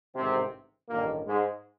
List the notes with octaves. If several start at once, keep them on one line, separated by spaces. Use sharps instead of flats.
A1 G#2 C3 D#3 C4
A1 G2 A#2 D#3 A#3
G#2 G#3